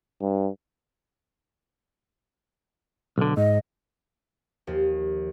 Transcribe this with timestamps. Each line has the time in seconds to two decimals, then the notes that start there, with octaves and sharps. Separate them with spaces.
0.21 G2
3.18 B1 D3
3.37 G#2 D#5
4.67 D#2 F3